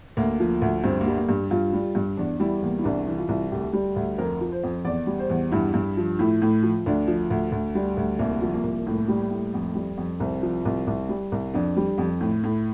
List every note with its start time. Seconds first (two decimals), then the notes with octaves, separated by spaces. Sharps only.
0.17 D2 A#3
0.40 F3
0.62 D2
0.84 G2 C4
1.01 A#3
1.06 G3
1.18 A#3
1.29 G2
1.51 G2 F4
1.73 G3
1.95 G2
2.17 E2 D4
2.40 G3 E4
2.62 E2 A#3
2.79 E4
2.84 C2 D4
3.07 E3
3.18 F4
3.29 C2
3.51 D2 G4
3.73 G3
3.96 D2
4.18 F2 A#4
4.41 F3
4.52 C5
4.63 F2
4.85 E2 D5
5.07 G3
5.19 C5
5.30 E2
5.52 G2 E4
5.74 G2
5.97 F3
6.19 A2 E4
6.42 A2
6.63 F3
6.86 D2 D4
7.07 F3
7.30 D2
7.52 D2
7.75 G3
7.97 D2
8.19 C2 A#3
8.42 F3
8.53 A#3
8.63 C2
8.87 A2
9.08 G3
9.31 A2
9.54 F2
9.75 G3
9.97 F2
10.20 C2 C4
10.43 F3
10.65 C2
10.87 C2
11.09 G3
11.32 C2
11.54 F2 D4
11.77 G3
11.98 F2
12.21 A2
12.43 A2